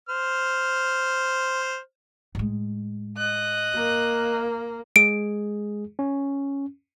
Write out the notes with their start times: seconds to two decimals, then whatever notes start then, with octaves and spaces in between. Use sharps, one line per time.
0.09 C5 F6
2.35 A2 G#3
3.17 D#5 F#6
3.76 A#3
4.96 G#3 G#4 D7
5.99 C#4